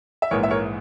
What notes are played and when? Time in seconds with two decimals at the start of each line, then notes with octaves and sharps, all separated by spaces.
0.22 E5
0.31 A#1 G#2 E3 A#4 C#5
0.43 E5
0.51 A#4 C#5